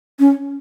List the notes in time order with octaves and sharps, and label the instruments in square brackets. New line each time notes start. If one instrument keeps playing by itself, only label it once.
[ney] C#4